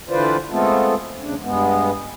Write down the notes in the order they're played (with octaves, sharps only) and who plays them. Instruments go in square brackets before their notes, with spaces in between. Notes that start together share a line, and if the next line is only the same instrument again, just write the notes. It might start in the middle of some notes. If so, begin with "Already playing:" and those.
[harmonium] D3 E3 F4 B4 C5 D5
G#3 A3 B3 C4 F4 A4
D#2 C#3 D4
G2 G#3 B3